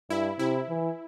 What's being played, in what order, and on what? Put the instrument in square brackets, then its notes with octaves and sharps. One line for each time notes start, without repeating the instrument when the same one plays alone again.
[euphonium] G2 [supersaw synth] E4
[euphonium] C3 [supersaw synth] E4
[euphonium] E3